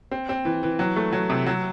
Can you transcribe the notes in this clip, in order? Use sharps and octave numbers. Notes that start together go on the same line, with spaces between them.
C4
C4
E3
E3
F#3
A3
F#3
C3
F#3